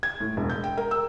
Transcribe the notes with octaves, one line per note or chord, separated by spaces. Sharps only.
G#6
A2
E1
G6
G5
A#4
E6